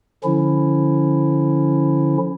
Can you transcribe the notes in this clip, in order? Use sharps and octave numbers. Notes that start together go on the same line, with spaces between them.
D3 F3 C#4 E4